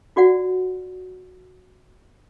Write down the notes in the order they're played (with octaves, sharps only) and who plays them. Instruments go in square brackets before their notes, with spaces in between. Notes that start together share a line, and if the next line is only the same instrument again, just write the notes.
[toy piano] F4 F#4 D5 F#5